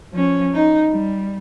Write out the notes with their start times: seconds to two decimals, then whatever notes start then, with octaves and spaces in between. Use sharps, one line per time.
0.12 F3 C#4
0.53 D#4
0.90 G3